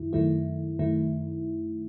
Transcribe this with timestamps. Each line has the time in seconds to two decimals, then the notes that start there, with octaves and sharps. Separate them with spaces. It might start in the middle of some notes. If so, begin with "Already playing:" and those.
Already playing: F#2 D#3 E4
0.13 F#2 D#3 A3 E4
0.79 F#2 D#3 A3 E4